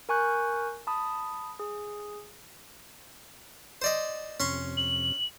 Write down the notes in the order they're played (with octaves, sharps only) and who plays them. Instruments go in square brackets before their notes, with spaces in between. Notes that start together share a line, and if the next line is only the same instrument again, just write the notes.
[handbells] A#4 G#5 C#6 F#6 G6
A5 B5 D#6
G#4
[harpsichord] C5 D5 D#5
[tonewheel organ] F2 C3 [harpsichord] C#4 C6 C#6
[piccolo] F#7